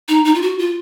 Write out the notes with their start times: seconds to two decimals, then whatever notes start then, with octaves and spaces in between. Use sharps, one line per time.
0.08 D#4
0.25 D#4
0.34 F4
0.42 F#4
0.58 F4